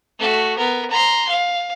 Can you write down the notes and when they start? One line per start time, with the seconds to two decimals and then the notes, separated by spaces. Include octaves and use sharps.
0.19 A3 F#4
0.57 B3 A#4
0.90 A#5 C6
1.29 F5